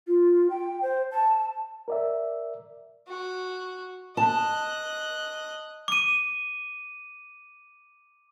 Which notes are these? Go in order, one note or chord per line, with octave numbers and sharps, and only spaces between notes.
F4
G5
C5
A5
A#4 D5 E5
F#4
D#5 A5 F#6
D6 D#7